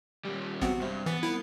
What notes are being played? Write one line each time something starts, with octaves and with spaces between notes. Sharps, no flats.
D#2 G3
A1 C3 B3 C4 F#4
G2 C3
E3 B3 A5
C2 E4 F5